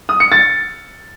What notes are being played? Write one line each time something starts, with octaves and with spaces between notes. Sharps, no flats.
D#6
C#7
A6